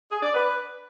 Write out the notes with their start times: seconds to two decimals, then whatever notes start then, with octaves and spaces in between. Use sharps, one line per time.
0.11 G#4
0.23 D5
0.34 B4